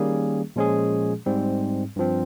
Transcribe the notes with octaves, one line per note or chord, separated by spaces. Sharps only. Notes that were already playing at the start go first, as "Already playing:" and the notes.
Already playing: D#3 G3 A#3 C#4 G#4
A#2 F3 G#3 C#4 G#4
G#2 G3 C4
G2 F3 C4